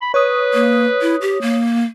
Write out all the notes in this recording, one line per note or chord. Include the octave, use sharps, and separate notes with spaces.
B5
B4 C#5 D#6
A#3
E4
G4
A#3